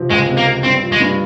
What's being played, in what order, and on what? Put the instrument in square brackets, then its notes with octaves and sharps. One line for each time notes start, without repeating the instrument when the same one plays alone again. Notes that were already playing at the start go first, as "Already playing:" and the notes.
Already playing: [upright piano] C3 F3 C4
[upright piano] C#2 [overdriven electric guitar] G#3
[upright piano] C3
[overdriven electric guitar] A#3
[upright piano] F3
[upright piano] G2 [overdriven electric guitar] C4
[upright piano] F3
[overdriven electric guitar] G#3
[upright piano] G2